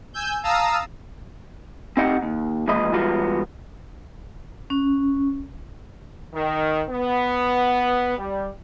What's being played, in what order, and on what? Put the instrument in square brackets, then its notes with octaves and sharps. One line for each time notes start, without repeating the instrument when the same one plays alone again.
[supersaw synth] G#5 E6 G6
F5 A5 A#5 D#6 E6
[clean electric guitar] C4 D#4 G4 D#5 F#5 G5
D#2
A#2 E3 F3 G#3 D#5 B5
E3 G3 G#3 B3 F4 F#4
[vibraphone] C#4
[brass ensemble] D#3
B3
G3